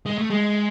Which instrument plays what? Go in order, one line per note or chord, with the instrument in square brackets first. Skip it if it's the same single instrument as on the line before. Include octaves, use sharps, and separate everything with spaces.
[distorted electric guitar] G#3
A3
G#3